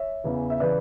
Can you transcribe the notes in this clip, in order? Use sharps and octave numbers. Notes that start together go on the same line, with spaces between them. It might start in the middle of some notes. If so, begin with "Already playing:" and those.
Already playing: C#5 E5
E2 C#3 E3
E5
C#3 E3 B4 D5